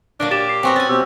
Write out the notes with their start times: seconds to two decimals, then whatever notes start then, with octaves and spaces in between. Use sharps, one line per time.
0.20 A#2 F#3 A#3 D4
0.31 G4 A6 D7 E7
0.49 C7
0.63 F#3 B3 C4 F#4 G5 G#5 C#6
0.76 C#4 G#5 A6
0.89 B2 C4 G4 E6